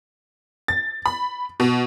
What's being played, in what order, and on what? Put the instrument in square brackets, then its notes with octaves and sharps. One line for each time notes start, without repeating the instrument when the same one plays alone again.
[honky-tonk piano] A6
B5
B2